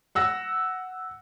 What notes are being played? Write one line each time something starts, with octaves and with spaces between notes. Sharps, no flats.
F#5 E6 A#6